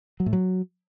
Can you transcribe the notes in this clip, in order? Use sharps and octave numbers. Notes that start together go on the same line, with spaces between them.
F#3
A2
F#3